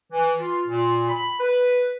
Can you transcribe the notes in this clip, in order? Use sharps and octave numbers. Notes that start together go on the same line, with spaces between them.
E3
F4
A#2
B5
B4